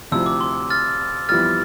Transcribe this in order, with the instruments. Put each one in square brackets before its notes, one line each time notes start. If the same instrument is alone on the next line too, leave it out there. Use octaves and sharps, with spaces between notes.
[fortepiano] D2 C3 F3 C4 E4 [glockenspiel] E6
[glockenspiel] D6
C6
F6 A6
[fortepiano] F2 E3 G3 B3 E4 [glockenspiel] F6 A6